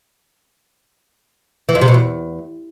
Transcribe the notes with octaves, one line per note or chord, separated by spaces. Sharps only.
E3
F2
C3
B2
E2